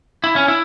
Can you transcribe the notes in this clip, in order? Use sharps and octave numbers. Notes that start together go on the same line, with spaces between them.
E4
C#4
E4